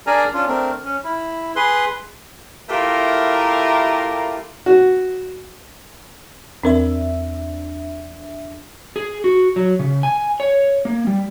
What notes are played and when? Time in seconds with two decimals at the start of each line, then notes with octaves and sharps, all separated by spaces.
0.07 D4 G#4 A#4 D5 G#5 A#5
0.34 C#4 D4 F4
0.48 A3 C4 D4 A#4
0.84 C#4
1.04 E4
1.56 G#4 B4 C6
2.70 A3 E4 F4 G4 A#4
4.66 F#4
6.64 E2 C4 D4 A#4 E5
8.96 G#4
9.24 F#4
9.56 F#3
9.79 C#3
10.03 G#5
10.40 C#5
10.85 A#3
11.07 G3